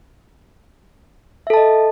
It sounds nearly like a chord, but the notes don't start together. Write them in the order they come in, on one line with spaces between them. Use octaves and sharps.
E5 A4 A5 D#5